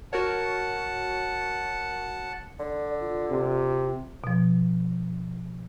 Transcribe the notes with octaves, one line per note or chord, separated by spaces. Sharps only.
F#4 A#4 C#5 F#5 A5
D3 D5
F4
C3
B2 F3